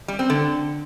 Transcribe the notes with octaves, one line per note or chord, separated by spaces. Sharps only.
G3
C4
D3